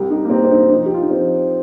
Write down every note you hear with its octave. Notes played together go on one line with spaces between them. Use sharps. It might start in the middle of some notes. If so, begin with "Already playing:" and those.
Already playing: C2 G4
D#4
A#3
C3 C4
C4
D#4
F3 D#4
G4
F4
D#4
F3 C4